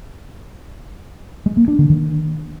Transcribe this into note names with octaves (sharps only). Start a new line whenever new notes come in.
G#3
A#3
D4
D3
D#3